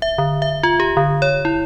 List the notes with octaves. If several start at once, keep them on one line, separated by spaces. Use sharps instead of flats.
E5
D3
E5
F4
G4
D3
C#5
E4